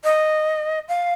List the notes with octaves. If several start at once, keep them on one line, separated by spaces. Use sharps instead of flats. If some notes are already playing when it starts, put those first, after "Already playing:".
D#5
F5